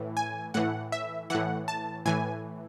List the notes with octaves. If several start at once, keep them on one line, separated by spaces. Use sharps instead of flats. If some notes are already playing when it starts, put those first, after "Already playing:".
Already playing: A2 E3
G#5
A2 E3 F#5
E5
A2 E3 F#5
A5
A2 E3 G#5